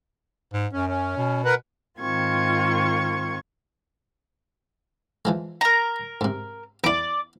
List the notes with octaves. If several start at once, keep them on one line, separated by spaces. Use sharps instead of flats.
G#2
F#2 C#4
C#4
B2
A#4 B4 F#5
G#2 D#3 C4 F4 C#6 G#6
E3 F3 G#3
A#4 A#5
G#2 C3
E2 E4 D5 D6